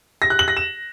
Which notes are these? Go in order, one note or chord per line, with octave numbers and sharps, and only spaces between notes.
A#6
F#6
F#7
A#6
E7